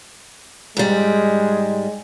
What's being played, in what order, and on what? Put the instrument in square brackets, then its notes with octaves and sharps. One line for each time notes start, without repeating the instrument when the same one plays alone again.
[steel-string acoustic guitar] G#2 G3 [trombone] G#3